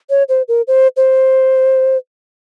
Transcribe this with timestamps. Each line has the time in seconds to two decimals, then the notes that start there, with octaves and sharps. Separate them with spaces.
0.10 C#5
0.29 C5
0.48 A#4
0.68 C5
0.97 C5